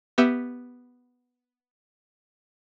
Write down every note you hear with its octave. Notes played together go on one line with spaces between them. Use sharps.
B3 G4 E5